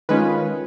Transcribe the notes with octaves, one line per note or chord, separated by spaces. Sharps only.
D#3 G#3 C#4 F4 B4